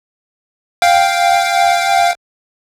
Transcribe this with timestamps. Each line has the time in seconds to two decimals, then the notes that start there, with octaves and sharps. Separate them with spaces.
0.82 F5 G5